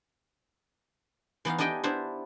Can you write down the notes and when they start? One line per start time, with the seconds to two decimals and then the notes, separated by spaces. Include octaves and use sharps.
1.45 E3 B3 D#4 F5
1.58 D4 D#4 G4 D#5 G5 G#5
1.84 B3 D4 E4 C5